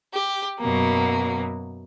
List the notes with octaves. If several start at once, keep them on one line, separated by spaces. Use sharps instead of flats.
G4
F#2 B2 F#3 A#3